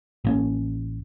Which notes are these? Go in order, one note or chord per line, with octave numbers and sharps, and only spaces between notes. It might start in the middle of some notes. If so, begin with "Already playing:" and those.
A1 A#3 C#4